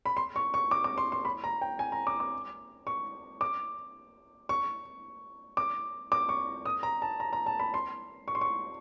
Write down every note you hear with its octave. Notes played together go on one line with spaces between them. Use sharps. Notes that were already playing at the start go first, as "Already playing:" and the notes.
B5
C6
C#6
C#6
D6
D6
C6
C6
B5
A#5
G5
G#5
A#5
D6
D6
C#6
D6
C#6
D6
D6
C#6
D#6
A#5
A5
A#5
A#5
A5
B5
C6
C#6
C6
C#6